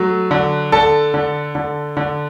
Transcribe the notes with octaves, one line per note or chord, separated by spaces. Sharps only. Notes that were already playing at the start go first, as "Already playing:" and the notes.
Already playing: F#3 A3
D3
D3 A4 A5
D3
D3
D3